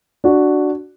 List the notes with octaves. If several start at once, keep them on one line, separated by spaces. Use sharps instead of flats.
D4 F#4